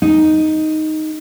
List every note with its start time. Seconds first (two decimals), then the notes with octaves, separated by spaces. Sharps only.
0.02 D#4